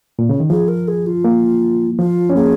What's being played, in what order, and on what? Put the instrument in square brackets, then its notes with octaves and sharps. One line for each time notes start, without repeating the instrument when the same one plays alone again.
[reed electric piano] A#2
C#3
D#3
[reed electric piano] F3 [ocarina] G#4
[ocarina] A#4
G#4
F4
[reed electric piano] A#3
[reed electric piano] F3 [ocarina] F4
[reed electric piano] C#4
[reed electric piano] A#3 [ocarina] G#4